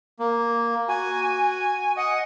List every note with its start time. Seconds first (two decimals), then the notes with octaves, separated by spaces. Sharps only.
0.19 A#3
0.88 F#4 G#5
1.97 D#5 F#5